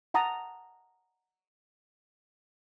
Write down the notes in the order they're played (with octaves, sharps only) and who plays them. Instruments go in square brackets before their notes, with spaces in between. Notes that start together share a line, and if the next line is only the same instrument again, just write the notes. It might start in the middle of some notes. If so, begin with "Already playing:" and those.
[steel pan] F#5 A5 A#5 D#6